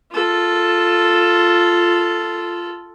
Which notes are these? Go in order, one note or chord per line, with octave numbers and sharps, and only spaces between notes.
F4 A4